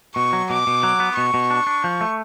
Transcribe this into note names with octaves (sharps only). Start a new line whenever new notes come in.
B2 C#6
F#3
B2 D6
B2
F#3
B3
B2 C#6
B2
D4
D4
F3
A3